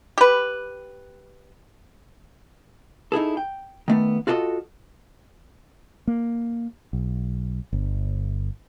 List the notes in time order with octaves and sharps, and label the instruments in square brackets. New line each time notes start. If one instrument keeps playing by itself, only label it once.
[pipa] G4 B4
[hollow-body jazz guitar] D#4 E4 G#4 A4
G5
D#3 A3 B3
F4 F#4 A4 D5 D#5
[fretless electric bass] A#3
B1
G1